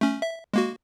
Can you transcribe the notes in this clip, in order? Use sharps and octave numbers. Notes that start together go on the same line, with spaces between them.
A3 C#4
E5
G#3 A#3 F#4